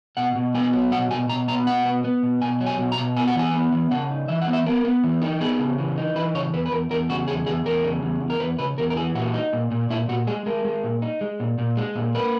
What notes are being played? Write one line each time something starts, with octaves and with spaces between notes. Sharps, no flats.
B2 F#5
B2
B3 G#5
F#3
B2 F#5
B2 G#5
B2 A#5
B3 A#5
B2 F#5
B3
B3
B2
B2 G#5
F#3
G#5
B2
A#5
B2
B3 G#5
F#5
E3 G#5
B3
E3
C#3 F#5
D#4
E3 E5
F#5
B3
E5
B3 A#4
B3
E3
D#4
B3 G#4
C#3
E3
D#4
E3 B4
C#3 C#5
E2 B4
B4
E2 A#4
E2 A#4
C#3 F#4
E2 G#4
E2 G#4
E2 A#4
C#3
E2
E2
A#4
E2 B4
C#3 B4
E2 A#4
A#4
E3 G#4
A#2 F#4
D#4
A#2
A#2
A#2 E4
A#2 F#4
G#3 G#4
G#3 A#4
G#3
A#2
D#4
G#3
A#2
A#2
G#3
A#2
A#3 B4